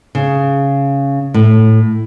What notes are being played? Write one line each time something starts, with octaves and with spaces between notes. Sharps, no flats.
C#3
A2